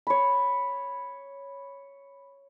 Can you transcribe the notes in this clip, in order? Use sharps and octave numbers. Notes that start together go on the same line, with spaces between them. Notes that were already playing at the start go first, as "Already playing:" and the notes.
C#5 B5